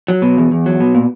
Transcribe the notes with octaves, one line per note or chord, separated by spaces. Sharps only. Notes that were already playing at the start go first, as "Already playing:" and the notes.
F#3
B2
E2
E2
F#3
B2
A#2